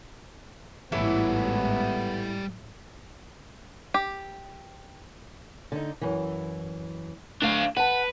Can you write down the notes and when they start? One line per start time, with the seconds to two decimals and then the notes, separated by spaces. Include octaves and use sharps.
0.92 A1 G#2 E3 G3 B3 E4 A4 C#5
3.94 G4
5.72 D3 D#4
6.01 F#2 E3
7.42 D2 A3 D4 F5
7.77 B4 F#5 A5